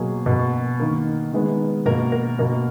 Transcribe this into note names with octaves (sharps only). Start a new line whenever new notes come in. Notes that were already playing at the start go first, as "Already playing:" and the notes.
Already playing: B2 F#3 A#3 G#4
B2 A#3
D#3 A#3
D#3 G#3 B3
B2 A#3 A#4
A#4
B2 A#3 A#4